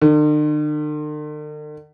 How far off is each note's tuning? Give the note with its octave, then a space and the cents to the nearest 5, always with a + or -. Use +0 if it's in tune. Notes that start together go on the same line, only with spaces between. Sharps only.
D3 +45